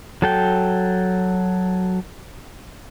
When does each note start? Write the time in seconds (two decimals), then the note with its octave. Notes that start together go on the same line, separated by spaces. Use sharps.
0.22 F#3 A4 G5